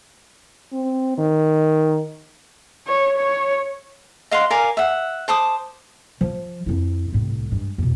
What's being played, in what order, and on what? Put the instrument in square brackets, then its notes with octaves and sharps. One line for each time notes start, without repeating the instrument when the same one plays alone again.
[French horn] C4
D#3
[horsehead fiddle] C#5
C#5
[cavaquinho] D#5 F5 F#5 C6
A#4 D5 F5 G#5
E5 F#5
C5 A5 D6 D#6
[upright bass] F3
F2 E4
C2 A2
G2 G#3
E2 B2